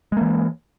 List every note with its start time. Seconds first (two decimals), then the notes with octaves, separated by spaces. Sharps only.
0.12 G#3
0.17 A#3
0.21 E3